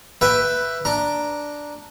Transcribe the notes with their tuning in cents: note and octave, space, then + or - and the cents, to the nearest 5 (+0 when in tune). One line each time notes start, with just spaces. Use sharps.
B4 +0 E5 +10 G5 +0
D4 +0 A#5 +0